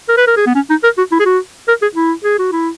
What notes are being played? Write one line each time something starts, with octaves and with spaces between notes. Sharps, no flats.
A#4
B4
A#4
G#4
B3
C#4
D#4
A#4
F#4
E4
G#4
F#4
A#4
G#4
E4
G#4
F#4
E4